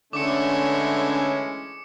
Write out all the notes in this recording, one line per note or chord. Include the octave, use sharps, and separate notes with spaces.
D3 E3 G#3 A3 C#4 D6 C#7